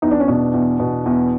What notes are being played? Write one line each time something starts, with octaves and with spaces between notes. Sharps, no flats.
E2 D#4
D4
C#4
B2 D4
E2
B2
E2